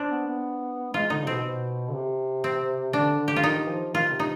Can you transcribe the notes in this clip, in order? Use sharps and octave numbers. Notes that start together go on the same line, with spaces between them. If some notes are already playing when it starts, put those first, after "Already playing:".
Already playing: C4 D4
B3
B3
G#3 F4
D3 D#4
B2 C4
B2
D3
C3
C4
D3 D4
D3
G4
F4
D#3 D#4
F3
D#3 F4
C3
D#4